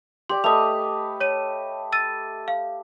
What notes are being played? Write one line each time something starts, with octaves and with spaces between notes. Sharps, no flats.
G4 D5 C6
A3 B4 D#5 D#6 F7
C#5 D#7
E6 A6 D#7
F5